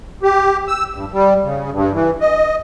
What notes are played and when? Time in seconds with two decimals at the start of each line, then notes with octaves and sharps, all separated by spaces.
0.23 G4
0.68 E6
0.94 G2
1.12 G3
1.43 C#3
1.71 G2
1.92 E3
2.21 D#5